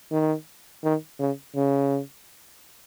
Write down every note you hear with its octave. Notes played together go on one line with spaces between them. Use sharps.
D#3
D#3
C#3
C#3